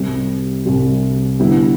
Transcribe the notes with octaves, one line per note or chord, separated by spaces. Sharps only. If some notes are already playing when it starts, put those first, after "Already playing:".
Already playing: C2 C3 G3
C2 C3 G3
D3 G3 B3 E4